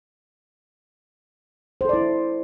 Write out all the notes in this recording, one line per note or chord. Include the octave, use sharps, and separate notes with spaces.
E4 A4 C5 D5